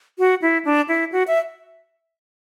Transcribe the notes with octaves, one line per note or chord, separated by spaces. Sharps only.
F#4
E4
D4
E4
F#4
E5